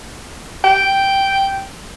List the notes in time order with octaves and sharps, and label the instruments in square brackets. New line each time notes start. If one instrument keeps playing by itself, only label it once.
[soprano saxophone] G5